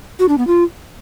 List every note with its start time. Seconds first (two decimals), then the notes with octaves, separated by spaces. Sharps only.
0.19 F#4
0.29 D4
0.38 B3
0.47 F4